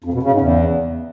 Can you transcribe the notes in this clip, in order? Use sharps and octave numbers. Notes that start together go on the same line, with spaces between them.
F2
B2
C#3
G#2
E2